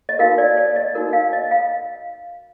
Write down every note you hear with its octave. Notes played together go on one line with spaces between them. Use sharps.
D#5
D#4 F#4 A#4 F5
D5
D5
D#5
D#4 F#4 A#4
F5
D#5
F5